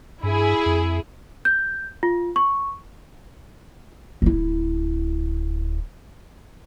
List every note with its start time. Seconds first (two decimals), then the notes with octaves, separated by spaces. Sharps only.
0.23 G2 E4 G#4
0.66 F2
1.45 G6
2.03 F4
2.36 C#6
4.22 D1 E4